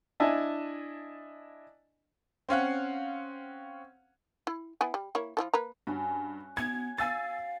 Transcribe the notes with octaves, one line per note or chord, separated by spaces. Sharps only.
D4 E4 D#5 E5 G#5 A5
C4 C#4 F5 F#5
E4
B3 E4 G#5
G3
A#3 E4 C#5
F3 E4 A4
A#3 B4 A#5
G2 C#4 F#4
B3 G#6
F5 G#5 E6 A6